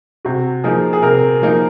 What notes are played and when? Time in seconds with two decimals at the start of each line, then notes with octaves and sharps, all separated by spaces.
0.25 C3 F#4
0.64 F3 A#3 D#4 G#4
0.93 G#4
1.02 C3 A#4
1.42 F3 A#3 D#4